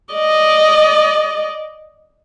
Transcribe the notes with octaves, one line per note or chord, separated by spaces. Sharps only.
D5 D#5